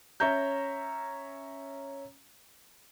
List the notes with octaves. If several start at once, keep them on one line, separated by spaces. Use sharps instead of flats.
C#4 C#5 E5 A#5 G6